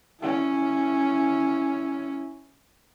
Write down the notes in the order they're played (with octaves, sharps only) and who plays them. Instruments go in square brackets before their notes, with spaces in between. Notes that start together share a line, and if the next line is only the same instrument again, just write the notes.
[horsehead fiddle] C#4 E4